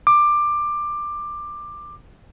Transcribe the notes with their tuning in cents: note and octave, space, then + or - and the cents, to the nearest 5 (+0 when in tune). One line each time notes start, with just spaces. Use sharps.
D6 +15